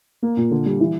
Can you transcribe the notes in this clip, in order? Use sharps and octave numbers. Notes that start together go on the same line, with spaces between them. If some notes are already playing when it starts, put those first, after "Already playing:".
A#3
A#2
D3
G3
E3